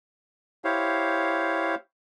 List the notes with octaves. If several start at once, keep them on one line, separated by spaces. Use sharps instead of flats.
E4 G4 C5 C#5 F5